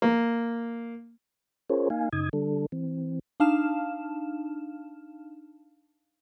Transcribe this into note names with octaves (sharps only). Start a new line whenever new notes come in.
A#3
C#4 F4 G#4 A#4 C5 C#5
A#3 D#4 F5 G#5
F#2 C#3 D#4 D#6 G#6
D3 G3 D4 A4
E3 C4
D4 D#4 F5 A5 F6 E7